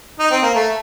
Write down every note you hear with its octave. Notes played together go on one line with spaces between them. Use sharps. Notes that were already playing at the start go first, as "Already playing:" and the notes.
D#4
C4
A#3
A3